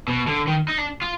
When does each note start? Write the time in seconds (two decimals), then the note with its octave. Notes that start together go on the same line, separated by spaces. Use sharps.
0.08 B2
0.27 D3
0.47 D#3
0.68 D#4
0.78 D4
1.02 F4